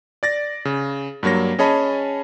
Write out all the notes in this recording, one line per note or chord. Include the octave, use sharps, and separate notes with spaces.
D5 A6 A#6
C#3
G2 F#3 A#3 C#5 A#6
C#4 G#4 C#5 D#5 A5 B5